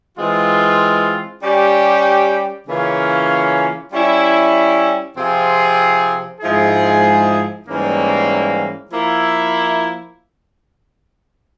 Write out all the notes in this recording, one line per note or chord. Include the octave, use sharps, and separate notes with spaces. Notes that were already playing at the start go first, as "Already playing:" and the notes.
E3 G#3 C4 F4
G3 C#4 G4
C#3 E3 A#3 C#4 F4
G3 C#4 E4
C3 F3 C4 F4 G#4
G#2 F3 G#3 E4 G#4
G#2 E3 G3 A#3 C#4
F3 A#3 E4